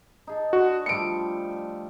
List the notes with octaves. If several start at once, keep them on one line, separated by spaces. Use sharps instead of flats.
D#4 G#4 A5
D3 F#4
F3 G3 A3 C#7 D7